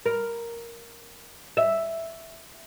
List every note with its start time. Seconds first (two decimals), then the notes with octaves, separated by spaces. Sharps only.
0.06 A#4
1.57 E5